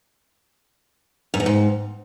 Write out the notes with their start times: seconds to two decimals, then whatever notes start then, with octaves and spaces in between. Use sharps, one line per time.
1.34 F#2
1.40 E2
1.46 G#2